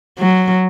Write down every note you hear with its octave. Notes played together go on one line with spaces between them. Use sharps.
F#3